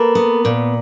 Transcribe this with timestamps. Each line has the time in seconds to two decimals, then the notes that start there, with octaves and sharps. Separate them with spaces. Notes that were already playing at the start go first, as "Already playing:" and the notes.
Already playing: A#3 A4 B4
0.15 B3
0.45 A#2